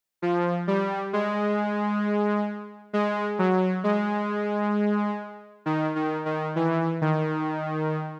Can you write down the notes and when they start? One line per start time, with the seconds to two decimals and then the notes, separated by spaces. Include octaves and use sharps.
0.22 F3
0.67 G3
1.13 G#3
2.93 G#3
3.39 F#3
3.84 G#3
5.66 D#3
5.96 D#3
6.26 D#3
6.56 E3
7.01 D#3